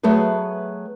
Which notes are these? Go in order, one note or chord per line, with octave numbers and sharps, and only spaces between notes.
F#3 A3 B3 G#4 B4